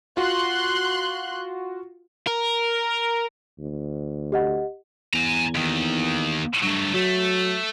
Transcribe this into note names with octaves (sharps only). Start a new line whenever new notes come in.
F4 F#4 C6 F#6
A#4
D2
G4 D#5 F#5
E2 G#5 A#5
D#2 D#3
G2 F#3 A3
F#3 A3